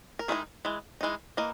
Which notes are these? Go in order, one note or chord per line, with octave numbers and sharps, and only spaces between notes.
A#4
D#3 G#3 D#4 E4 G#4
E3 G#3
E3 G#3 D#4
E3 A#3 D#5